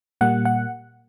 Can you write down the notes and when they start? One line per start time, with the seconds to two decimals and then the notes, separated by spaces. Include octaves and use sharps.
0.21 A#2 G3 A#3 F#5
0.45 F#5